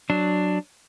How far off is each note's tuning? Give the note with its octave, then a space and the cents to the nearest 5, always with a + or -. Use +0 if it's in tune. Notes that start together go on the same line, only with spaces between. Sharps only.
F#3 +0 D4 +10